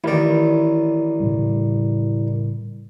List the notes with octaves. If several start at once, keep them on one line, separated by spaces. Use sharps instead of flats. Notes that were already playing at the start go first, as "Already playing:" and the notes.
A1 D#3 E4 A#4 D5
A2 C#3 G3